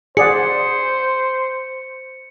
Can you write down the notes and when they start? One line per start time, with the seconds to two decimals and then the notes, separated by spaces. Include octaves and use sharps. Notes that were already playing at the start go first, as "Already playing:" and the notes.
0.17 G#4 C5 D5 F#5 C#7